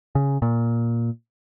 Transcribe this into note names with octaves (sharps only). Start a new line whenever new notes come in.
C#3
A#2